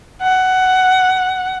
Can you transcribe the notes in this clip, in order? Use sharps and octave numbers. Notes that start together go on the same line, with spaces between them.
F#5